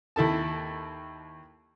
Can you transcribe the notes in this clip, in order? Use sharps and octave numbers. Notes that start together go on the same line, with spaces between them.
D#2 E4 A4 A5